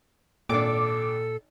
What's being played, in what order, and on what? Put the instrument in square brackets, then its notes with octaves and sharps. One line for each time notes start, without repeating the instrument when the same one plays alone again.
[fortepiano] G#1 D4 [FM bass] A#2 [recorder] A4 [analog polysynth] D6